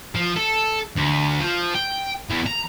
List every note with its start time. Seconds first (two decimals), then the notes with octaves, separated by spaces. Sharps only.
0.15 F3
0.36 A4
0.96 D2
1.40 F3
1.74 G5
2.30 E2
2.46 A#5